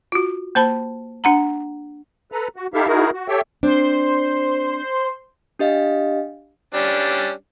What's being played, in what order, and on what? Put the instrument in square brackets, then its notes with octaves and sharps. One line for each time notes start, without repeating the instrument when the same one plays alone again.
[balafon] F4 F#4
A#3 C5 A5 B5
D4 F#5 A#5
[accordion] A4 B4 A#5
F#4
D#4 E4 G4 A4 E5 F5
D#4 E4 F#4 G#4 A#4
F#4
G4 A4 C#5 E5 G5
[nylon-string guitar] C4 D4 [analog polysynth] C5 C6
[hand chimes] D4 G4 D#5 F5
[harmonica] G3 C#4 D4